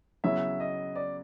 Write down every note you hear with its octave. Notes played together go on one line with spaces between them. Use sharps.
C#3 F#3 B3 E4 E5
D#5
D5